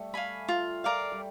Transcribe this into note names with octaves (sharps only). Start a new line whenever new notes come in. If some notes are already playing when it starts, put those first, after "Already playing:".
Already playing: G3 A3
F5 G#5 B5
F4
A#4 D5 F5
G3